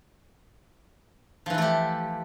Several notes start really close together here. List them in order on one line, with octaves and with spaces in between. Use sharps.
F3 E3 E4 A3 G4